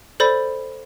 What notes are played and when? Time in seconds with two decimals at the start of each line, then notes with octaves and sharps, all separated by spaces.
0.20 A4 C5 D5 B5